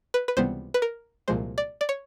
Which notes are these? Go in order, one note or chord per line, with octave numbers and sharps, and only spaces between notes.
B4
B4
C#2 C3 E3 G3 B3 C5
B4
A#4
C2 A#2 F3 G#3 C5
D5
D5
C#5